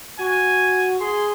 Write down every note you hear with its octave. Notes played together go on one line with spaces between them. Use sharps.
F#4 G#5
G#4 C6